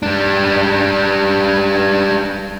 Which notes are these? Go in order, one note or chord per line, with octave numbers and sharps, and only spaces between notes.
G3 D4